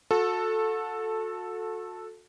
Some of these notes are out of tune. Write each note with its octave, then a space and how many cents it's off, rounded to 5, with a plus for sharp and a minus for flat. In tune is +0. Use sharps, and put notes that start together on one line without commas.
F#4 -35 A4 +0